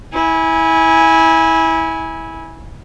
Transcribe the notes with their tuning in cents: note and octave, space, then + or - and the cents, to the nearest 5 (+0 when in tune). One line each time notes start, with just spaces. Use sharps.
E4 -25 G#5 -5